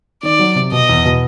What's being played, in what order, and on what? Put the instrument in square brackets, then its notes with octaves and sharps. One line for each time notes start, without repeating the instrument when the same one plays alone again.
[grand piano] D#3 [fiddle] D5
[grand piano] F#3
C3
[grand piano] B2 [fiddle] D#5
[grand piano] E2
B2